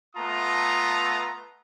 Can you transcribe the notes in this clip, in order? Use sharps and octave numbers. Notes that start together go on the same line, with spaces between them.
A3 B3 F4 A5 A#5 D#6